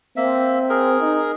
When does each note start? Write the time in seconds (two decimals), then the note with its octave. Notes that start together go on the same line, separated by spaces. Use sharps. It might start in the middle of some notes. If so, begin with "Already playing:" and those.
0.17 A#3 C4 E5
0.70 G#4 A#4
1.00 D#4